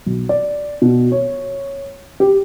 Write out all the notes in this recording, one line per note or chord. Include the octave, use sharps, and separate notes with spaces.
B1
D5
B2
C#5
G4